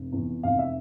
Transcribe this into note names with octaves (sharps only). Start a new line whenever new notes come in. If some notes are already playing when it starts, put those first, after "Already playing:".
Already playing: F1
E2
F1 F5
E5